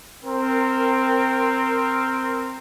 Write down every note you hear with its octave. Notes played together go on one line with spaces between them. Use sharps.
C4 A#4